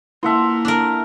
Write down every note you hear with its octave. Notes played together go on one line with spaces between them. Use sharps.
A#3 E4 E5 F#5 A5 C6
D4 A#4